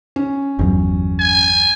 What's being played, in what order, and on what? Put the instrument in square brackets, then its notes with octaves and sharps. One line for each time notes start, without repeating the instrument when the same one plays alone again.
[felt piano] C#4
[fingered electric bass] G1 E2 F#3
[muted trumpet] G#5